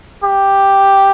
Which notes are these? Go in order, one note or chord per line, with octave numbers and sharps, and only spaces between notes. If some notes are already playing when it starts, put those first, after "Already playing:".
G4